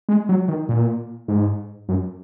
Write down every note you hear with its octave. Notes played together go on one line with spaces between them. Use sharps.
G#3
F#3
D#3
A#2
G#2
F#2